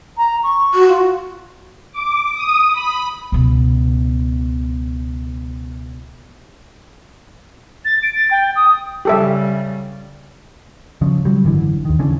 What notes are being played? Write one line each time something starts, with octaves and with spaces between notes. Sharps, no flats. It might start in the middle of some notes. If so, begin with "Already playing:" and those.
A#5
C#6
F#4
F4
D6
D#6
B5
C#2 B2
A6
D7
A6
G5
D#6
C#3 G3 G4 A4 E5
C#3 F3 C#4
C#3 F#3 G3
G#1 F#2 D3 E3
D#2 D#3
C#3 E3 C#4 D4